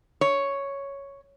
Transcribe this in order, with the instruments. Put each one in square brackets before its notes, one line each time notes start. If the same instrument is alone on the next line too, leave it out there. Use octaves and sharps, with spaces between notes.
[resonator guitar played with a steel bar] C#5